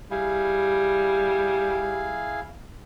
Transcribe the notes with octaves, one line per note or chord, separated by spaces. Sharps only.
G3 E4 G#4 F5